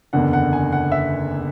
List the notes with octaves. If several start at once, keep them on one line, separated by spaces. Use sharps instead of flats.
F#1 E2 D3 F#5
F#5
G#5
F#5
E5